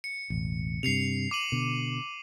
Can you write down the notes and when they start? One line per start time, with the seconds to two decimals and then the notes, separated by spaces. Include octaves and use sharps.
0.04 C#7
0.30 E1 A1
0.83 G2 C3 C7 C#7 F7
1.31 D6 D#7 F#7
1.52 B2 D3